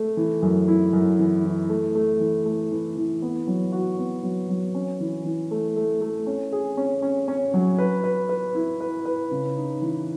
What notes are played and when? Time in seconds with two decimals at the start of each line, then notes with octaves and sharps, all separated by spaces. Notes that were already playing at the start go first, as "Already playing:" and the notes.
Already playing: A3
0.17 E3
0.42 F#2
0.68 E4
0.93 F#2
1.19 E3
1.44 E3
1.69 A3
1.95 A3
2.20 E3
2.45 A3
2.71 E3
2.97 E3
3.22 B3
3.47 F#3
3.72 F#4
3.98 B3
4.23 F#3
4.49 F#3
4.75 C#4
5.00 E3
5.25 E3
5.51 A3
5.76 A3
6.01 A3
6.26 C#4
6.52 G#4
6.77 C#4
7.02 C#4
7.28 C#4
7.54 F#3
7.78 B4
8.04 B4
8.29 B4
8.55 E4
8.80 B4
9.05 B4
9.31 C#3
9.57 D#4
9.82 E3